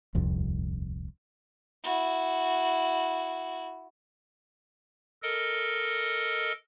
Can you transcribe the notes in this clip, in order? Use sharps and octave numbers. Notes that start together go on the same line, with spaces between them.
D#1 C2 F2
E4 F#4
A4 A#4 D#5